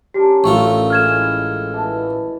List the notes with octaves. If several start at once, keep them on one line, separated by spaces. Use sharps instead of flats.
C#4 D4 G4 A#4
A1 A3 F4 C#6
A2 G#3 B5 F6 G#6 E7
B2 E3 A5